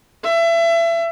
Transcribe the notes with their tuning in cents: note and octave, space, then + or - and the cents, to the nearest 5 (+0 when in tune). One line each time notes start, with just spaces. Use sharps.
E5 +30